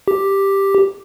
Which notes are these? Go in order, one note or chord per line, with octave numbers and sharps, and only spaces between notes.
G4